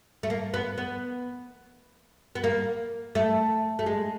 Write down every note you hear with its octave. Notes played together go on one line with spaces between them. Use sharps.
A3
A#3
B3
B3
B3
A#3
A3
A3
G#3